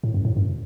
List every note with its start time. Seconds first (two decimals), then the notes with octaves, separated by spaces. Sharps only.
0.03 A2
0.14 F#2
0.25 A2
0.37 F#2